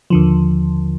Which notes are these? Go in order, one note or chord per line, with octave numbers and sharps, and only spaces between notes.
D#2 D3 F3